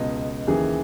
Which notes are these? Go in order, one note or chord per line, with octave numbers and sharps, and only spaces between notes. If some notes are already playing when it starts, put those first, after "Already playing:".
Already playing: C#2 B2 D#5
D#2 C#3 E3 G#4